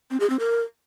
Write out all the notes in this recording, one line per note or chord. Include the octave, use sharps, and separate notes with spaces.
C4
G#4
C4
A#4